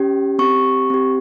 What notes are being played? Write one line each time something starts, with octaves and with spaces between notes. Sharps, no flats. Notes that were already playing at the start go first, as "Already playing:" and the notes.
Already playing: C#4 G4
C4 G4 C#6
C4 G4